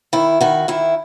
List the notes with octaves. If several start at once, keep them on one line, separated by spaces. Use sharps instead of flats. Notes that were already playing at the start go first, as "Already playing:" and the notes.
D#3 E4
D#3 F#4
D#3 E4